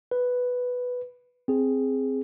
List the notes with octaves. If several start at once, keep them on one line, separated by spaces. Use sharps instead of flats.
B4
C4 G#4